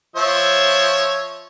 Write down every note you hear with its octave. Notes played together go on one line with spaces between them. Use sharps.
F3 C#5 E5